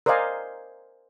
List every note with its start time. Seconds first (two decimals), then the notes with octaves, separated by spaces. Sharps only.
0.06 A#4 C5 D5 D#5 F5 G#5